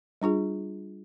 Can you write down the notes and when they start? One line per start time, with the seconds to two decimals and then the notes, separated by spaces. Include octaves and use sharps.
0.22 G3 D4 F4 G#4